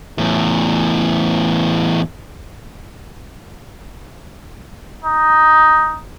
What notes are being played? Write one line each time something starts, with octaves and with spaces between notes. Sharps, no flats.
E2 A2
D#4